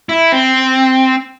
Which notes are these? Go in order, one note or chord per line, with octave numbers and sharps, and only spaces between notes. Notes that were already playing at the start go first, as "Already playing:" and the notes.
E4
C4